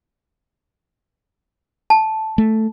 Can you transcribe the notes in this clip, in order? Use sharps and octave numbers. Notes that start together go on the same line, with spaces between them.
A5
A3